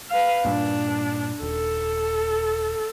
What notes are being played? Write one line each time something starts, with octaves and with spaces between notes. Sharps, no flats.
B4 F5
G2 A#2 D4
D#1 A4